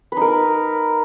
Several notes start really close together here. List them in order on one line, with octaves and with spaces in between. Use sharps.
B4 D#4 A#4